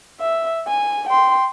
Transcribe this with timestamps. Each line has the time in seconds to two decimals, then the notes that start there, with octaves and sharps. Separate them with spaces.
0.20 E5
0.68 G#5
1.10 G5 C6